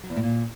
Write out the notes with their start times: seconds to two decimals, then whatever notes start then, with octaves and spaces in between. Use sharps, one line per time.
0.03 F#3
0.10 E2
0.16 A2
0.23 A#2